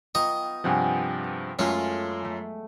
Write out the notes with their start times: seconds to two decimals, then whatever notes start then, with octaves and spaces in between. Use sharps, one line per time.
0.15 B3 F4 D#5 G5 A#5 C#6
0.64 G2 C3 F3 G#4 F#5 G5
1.59 F#2 G#3 A3 C#4 F4
2.25 A3